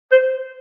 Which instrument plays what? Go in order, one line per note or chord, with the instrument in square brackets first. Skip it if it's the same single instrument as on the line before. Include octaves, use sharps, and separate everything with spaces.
[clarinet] C5